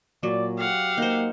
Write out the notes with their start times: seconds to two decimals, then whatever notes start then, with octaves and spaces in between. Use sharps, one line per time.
0.23 A#2 F#3 D5
0.58 G4 F5 F#5
0.98 A#3 D#4 C5